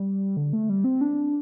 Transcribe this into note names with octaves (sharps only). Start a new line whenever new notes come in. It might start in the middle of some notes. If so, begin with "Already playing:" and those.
Already playing: G3
D3
A3
G3
C4
D4